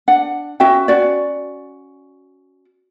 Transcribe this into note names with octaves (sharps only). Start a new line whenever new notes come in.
D4 F#5
C#4 F#4 E5 G5
C#4 F#4 D5